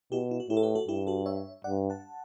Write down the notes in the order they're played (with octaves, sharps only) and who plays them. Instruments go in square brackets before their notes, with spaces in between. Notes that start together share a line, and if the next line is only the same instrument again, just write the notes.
[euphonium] B2 [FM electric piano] E4 G4
[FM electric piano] E4
F#4
[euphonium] A2 [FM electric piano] E4 G4
[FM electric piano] A4
G4 B4
F#4 A4
[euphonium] G2 [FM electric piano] E4 G4
[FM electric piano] F#4 A4
C#5 E5
[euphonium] G2 [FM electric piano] D5 F#5
[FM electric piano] F#5 A5